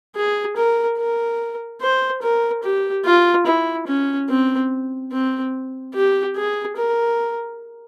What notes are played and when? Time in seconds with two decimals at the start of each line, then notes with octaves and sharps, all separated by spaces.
0.16 G#4
0.56 A#4
0.98 A#4
1.81 C5
2.22 A#4
2.63 G4
3.05 F4
3.46 E4
3.87 C#4
4.29 C4
5.12 C4
5.95 G4
6.36 G#4
6.77 A#4